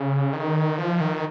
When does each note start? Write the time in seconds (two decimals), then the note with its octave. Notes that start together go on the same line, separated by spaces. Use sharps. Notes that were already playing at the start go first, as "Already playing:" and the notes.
Already playing: C#3
0.33 D#3
0.78 F3
1.01 D#3